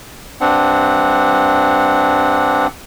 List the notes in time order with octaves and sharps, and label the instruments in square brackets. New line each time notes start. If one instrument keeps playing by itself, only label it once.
[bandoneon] G2 C4 D4 F#5